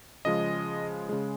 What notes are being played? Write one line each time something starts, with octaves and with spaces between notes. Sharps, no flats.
C#3 F3 G#3 D#5
C#3 G#3